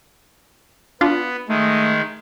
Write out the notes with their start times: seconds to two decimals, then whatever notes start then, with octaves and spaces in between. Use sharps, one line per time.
1.01 B3 D4 F4
1.49 D#3 G#3 A3